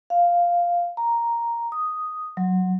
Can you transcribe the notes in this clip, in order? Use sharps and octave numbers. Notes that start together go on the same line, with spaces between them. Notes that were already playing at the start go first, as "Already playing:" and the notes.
F5
A#5
D#6
F#3